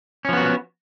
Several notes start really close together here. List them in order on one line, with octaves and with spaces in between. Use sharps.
C#4 F3 B3 F#4